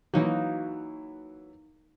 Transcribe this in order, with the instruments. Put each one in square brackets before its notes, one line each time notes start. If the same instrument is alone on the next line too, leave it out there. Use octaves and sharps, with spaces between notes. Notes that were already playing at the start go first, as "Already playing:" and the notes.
[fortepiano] E3 F#3 [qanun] A#3 D#4 F#4